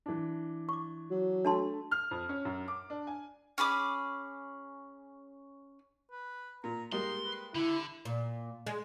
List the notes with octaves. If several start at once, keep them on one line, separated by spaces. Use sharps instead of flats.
E3 D4
C#6 D6
F#3
A3 D4 A5 C6
F6
F2
C#4
F#2
D6
D4
G#5
C#4 G#4 B5 D6
B4
A#2 A#5
G3 G#3 A#3 D#4 C6
B4
D3 E4 B5
A#2
G#3